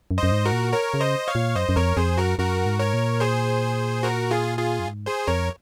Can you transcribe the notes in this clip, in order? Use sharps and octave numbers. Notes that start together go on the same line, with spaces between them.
F#2
C5 D#5
F#2
G#2
F#4 A#4
A#2
A#4 C#5
C#3
C5 D#5
C#5 F5
A#2
F#2 C5 D#5
F#2
F2 A#4 C#5
F2 G#4 C5
F#2 F#4 A#4
F#2 F#4 A#4
G#2
A#4 C#5
A#2
G#4 C5
F#4 A#4
F4 G#4
F4 G#4
F#2
G#2
G#4 C5
F2 A#4 C#5